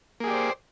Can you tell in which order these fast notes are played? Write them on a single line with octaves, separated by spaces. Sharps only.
A#3 G#4 G4 D5 C5